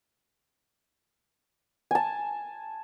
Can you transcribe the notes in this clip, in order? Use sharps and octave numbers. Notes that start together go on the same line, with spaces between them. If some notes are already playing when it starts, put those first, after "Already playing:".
G#5 A5